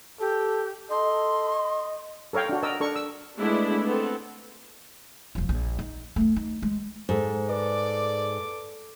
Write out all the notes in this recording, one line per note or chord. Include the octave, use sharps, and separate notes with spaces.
G4 A4
A4 D#5 C6
A4 A#4 C#5 F5 G5
D4 F#4
A#4 D#5 A5 E6
D4 A4 A#4 C#6
E6
G#3 A3 B3 D4 E4
B3 C4 A4
E1 F3
A#1
D#4
A3 B3
D#4
G#3
G#2 A4 C5
A4 B4 D5 D6